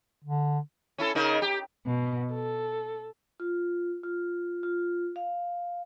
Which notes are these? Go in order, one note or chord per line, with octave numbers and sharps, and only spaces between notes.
D3
C#4 E4 A4
C#3 D#4 A#4
G4
B2
A4
F4
F4
F4
F5